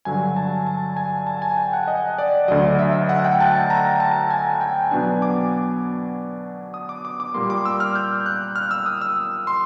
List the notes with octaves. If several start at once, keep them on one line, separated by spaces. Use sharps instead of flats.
G2 D3 F#3 G#5
A5
A5
G#5
A5
G#5
G5
F#5
D#5
D5
D2 D3 F#3 D#5
E5
F#5
G5
A5
A5
A#5
A5
G#5
G5
B2 F#3 B3 D4 G#5
D6
D#6
D6
D6
D6
A#2 G3 A#3 C6
D6
E6
F6
G6
F#6
F6
E6
D#6
E6
C6